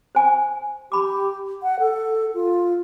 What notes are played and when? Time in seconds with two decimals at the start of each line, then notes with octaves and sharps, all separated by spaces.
0.15 C5 G#5
0.92 G4 B5 D6
1.63 F#5
1.80 A4
2.34 F4